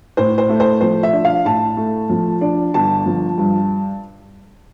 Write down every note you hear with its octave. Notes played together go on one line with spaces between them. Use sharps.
A2 C5
C5
A3
C5
F3 C5
E5
D4
F5
A2 A5
A3
F3
D4
G1 A5
F3
G2